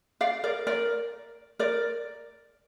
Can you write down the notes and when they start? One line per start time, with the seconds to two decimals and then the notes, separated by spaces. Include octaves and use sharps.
0.21 D5 F5
0.44 A#4 D5
0.67 A#4 D5
1.59 A#4 D5